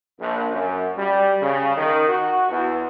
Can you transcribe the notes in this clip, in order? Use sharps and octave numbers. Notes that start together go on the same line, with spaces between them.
A#1
F#2
G3
C#3
D#3
F#4
E2